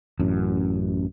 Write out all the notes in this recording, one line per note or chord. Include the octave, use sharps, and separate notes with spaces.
A1 F#2